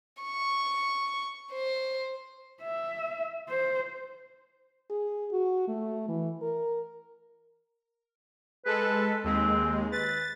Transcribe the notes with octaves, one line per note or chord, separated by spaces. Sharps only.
C#6
C5
E5
C5
G#4
F#4
A3
E3
A#4
G#3 A4 B4
D#2 G#3 C4
B4 A6